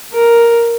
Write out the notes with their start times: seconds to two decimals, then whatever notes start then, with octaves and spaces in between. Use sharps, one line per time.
0.13 A#4